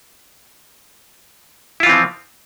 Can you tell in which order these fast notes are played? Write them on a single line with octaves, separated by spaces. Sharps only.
E4 F4 E3 C4 F3